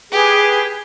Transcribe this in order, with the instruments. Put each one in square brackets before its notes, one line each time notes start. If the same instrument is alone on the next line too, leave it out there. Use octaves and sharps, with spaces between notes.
[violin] G4 [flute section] G#4 B4